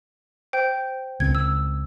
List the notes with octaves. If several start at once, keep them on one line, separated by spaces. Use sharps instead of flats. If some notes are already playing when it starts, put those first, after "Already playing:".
C5 G5 G6
C#2 C4 G#6
E6